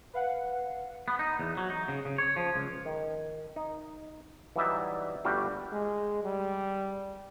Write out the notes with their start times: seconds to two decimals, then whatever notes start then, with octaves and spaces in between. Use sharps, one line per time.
0.14 B4 F5 F#5
1.08 B3
1.19 D#4
1.39 E2
1.57 F#3
1.70 D#4
1.88 C#3
2.05 C#3
2.18 C#5
2.36 F3
2.55 C#2
2.85 D#3
3.56 D#4
4.56 E3 F#3 G3 D#4 D5 E5
5.24 G1 G3 A3 F#4 G4 F5
5.72 G#3
6.24 G3